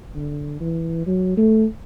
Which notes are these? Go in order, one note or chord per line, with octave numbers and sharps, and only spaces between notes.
D3
E3
F#3
A3